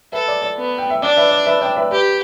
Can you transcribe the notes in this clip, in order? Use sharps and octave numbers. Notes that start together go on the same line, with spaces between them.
A4 B4 E5
D5
D5
B3
G5
E5
D4 D5
B4 E5
D5
B4 E5
D5 G5
B4 E5
G4 B4